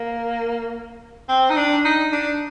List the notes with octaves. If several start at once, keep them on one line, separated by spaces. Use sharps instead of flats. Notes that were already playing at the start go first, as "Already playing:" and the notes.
Already playing: A#3
C4
D#4
D4
D#4
D4